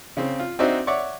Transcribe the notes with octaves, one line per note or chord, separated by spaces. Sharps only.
C#3 C4
F4
C4 D4 D#4 F#4 C5 E5
C#5 D5 E5 F#5 C#6 D6